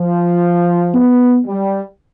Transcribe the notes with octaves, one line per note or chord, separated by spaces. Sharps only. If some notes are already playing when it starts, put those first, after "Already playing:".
Already playing: F3
B3
G3